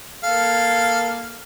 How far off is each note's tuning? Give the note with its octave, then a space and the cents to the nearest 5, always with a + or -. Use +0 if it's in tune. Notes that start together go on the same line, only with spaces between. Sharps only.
A#3 +10 A4 +0 F5 -5